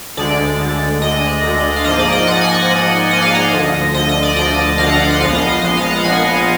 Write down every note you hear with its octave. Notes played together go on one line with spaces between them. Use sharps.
D2 D3 G#3 D5
D2 D3 G#3
D2 D3 G#3 D#5
D2 D3 G#3
F5
G#2 F3 A#3 D#5
D5
D#5
G#2 F3 A#3 F#5
G#5
F#5
G#2 F3 A#3
G#2 F3 A#3 D#5
F5
D#5
D2 D3 F3
D2 D3 F3 D#5
D#5
D5
D2 D3 F3 D#5
D2 D3 F3 F5
F#5
D#5
A#1 A#2 F3 G#3 B3 F5
D#5
D#5
A#1 A#2 F3 G#3 B3 D#5
F5
F#5
A#1 A#2 F3 G#3 B3 G#5